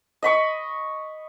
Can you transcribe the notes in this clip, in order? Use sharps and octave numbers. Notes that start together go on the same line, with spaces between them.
D#5 B5 C#6